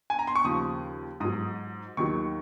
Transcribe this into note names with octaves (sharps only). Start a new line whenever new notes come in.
G#5
A#5
C6
C#6
D#2 C#3 F3 D#6
G#2 F#3 D#6
D#2 D#3 F#3 C#6